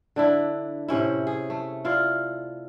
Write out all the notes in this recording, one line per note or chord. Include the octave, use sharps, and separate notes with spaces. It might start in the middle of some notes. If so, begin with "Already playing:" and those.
D3 D4 E4
A2 C3 C#4 E4
G#4
A3
E4 F4 D5 F5